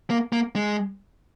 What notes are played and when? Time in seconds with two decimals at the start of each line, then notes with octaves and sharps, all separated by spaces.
0.10 A#3
0.33 A#3
0.55 G#3